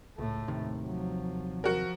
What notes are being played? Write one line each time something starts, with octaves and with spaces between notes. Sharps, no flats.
C#2 A2 A3
D#2 C3 D#3
F3 F#3
F3 F#4 A#4